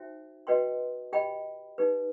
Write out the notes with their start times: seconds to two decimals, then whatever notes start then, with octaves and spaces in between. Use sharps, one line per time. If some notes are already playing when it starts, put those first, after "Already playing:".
Already playing: D#4 F#4 C5 E5 G5
0.47 F#4 B4 D#5 G5 C6
1.13 G4 D#5 G5 B5
1.78 D#4 G4 B4